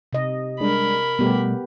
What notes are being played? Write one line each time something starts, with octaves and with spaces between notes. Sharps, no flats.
C3 D#5
G3 G#3 D4 A#4 B5
B2 G3 A3 B3 G4